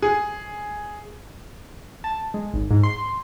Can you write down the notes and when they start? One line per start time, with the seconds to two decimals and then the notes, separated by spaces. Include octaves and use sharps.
0.02 G#4
2.04 A5
2.34 G#3
2.54 G#1
2.71 G#2
2.83 C6